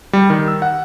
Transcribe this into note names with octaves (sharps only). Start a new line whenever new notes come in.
G3
D#3
E6
F#5